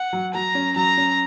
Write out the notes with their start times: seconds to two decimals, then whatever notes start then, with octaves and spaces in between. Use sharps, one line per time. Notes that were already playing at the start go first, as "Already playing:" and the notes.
Already playing: F#5
0.13 F#3
0.34 F#3 A#5
0.55 C#4
0.76 F#3 A#5
0.97 C#4